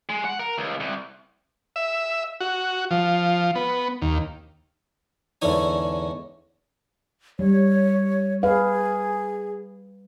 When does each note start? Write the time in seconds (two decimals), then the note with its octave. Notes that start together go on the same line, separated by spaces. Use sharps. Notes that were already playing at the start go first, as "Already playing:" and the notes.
0.09 G#3
0.25 F#5
0.39 A#4
0.58 C#2
0.80 C2
1.76 E5
2.40 F#4
2.91 F3
3.55 B3
4.02 D#2
5.42 E2 G#2 D3 C#4 G#5
7.39 G3 C#5
8.43 G#4 B4 F5